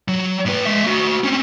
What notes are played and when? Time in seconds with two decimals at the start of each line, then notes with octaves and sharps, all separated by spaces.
0.08 F#3
0.45 A2 B4
0.65 G#3 E5
0.85 A3 F#4
1.24 C4 C#4